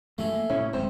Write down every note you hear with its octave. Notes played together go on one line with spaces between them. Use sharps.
F#2 E3 G#3 A3 G#4
A#3
A2 C3 C#4 E4
D1 F2 G#2 C4